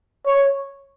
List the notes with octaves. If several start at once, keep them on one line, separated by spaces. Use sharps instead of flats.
C#5